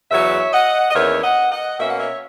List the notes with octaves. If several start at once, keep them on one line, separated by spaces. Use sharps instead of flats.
E2 C#3 F#3 C#5 E5
D#5 F#5
D#5
E2 D#3 A#3 C#4 C#5 E5
D#5 F#5
D#5 F#5
B2 A#3 C#4 E5
F#5
C#5 E5